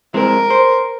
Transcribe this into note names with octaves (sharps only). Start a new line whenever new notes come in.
G#3 C4 E4 A#4
C5